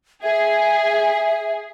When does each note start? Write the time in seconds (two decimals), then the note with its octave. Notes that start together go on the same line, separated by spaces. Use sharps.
0.23 G#4 E5